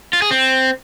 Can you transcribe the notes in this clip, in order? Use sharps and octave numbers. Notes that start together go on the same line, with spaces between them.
F4
G#4
C4